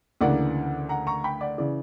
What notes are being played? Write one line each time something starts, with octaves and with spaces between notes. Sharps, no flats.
D2 C#3 E3 A#3 D4 D5 F#5
F#5 A#5
A#5 C#6
G5 B5
D5 F#5
C#3 E3 D5